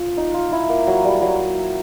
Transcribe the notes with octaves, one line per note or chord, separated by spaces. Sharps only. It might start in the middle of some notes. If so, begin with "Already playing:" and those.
Already playing: F4
D#4
F4
E4
A#3
F#3
G3
F#3